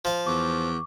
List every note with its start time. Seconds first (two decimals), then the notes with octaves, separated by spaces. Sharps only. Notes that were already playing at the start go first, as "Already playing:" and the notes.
0.05 F3 F5
0.27 E2 C#6 D6